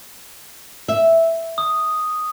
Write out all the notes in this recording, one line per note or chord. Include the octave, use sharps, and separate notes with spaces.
E5
D#6